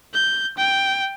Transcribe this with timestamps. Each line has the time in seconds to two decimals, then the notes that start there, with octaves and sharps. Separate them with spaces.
0.14 G6
0.57 G5